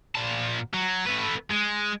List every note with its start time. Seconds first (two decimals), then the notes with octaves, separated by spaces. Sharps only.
0.15 A#2 A5
0.74 F#3
1.07 A3 B4
1.51 G#3